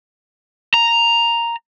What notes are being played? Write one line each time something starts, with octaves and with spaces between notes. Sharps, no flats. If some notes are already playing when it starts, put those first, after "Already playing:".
A#5